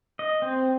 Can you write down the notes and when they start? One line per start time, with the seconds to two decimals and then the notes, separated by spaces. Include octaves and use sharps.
0.19 D#5
0.42 C4